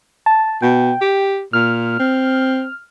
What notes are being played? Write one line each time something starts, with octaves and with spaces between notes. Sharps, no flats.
A5
B2 G5
G4
A#2 F6
C4